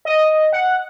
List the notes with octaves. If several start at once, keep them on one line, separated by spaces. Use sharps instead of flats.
D#5
F#5